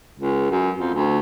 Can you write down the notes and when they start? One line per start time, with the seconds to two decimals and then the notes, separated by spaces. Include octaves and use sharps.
0.18 C#2
0.51 F#2
0.79 F2
0.94 D2